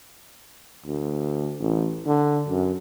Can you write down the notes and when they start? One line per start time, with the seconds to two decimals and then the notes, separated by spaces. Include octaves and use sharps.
0.86 D2
1.60 A1
2.06 D3
2.49 F#2